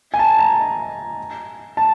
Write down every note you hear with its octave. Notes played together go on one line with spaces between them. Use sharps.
G#5
A5
A#5
A5